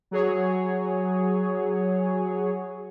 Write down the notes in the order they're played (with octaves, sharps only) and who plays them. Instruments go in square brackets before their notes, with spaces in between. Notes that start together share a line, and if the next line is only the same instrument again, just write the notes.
[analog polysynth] F#3 G#4 C#5